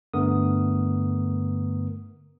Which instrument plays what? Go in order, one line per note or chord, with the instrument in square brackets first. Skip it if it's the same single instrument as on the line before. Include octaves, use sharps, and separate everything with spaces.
[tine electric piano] G2 D3 A3 B3 A#4 D#6